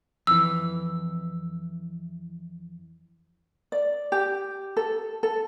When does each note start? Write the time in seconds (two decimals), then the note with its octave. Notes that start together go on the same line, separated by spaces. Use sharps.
0.27 F2 E3 E6
3.72 D5
4.12 G4
4.77 A4
5.23 A4